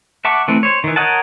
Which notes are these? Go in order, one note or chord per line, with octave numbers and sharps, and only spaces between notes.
E5 F#5 A5 C#6 D6
E3 A3 C4
C5 C#5
D#3 E3
A#4 C#5 D#5 F#5 A5